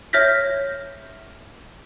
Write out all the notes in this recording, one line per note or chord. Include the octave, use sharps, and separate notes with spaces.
C#5 E5 F6 G6 A#6 B6